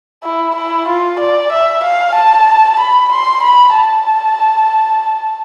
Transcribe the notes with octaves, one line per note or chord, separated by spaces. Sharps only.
E4
E4
F4
D5
E5
F5
A5
B5
C6
B5
A5